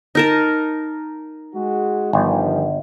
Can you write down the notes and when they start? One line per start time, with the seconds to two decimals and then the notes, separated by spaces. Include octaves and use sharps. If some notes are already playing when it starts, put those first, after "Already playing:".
0.15 D#4 A#4 A5
1.55 G#3 F#4
2.13 G1 G2 D#3 F3